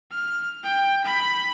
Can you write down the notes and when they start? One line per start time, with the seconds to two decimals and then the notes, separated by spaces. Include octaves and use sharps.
0.11 F6
0.64 G5
1.04 B5